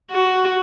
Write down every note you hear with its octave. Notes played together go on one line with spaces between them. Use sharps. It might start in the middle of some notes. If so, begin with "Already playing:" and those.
F#4